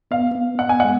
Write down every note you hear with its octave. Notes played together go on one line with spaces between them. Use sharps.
B3 F5
B3
B3 F#5
G#5
F#5
G#3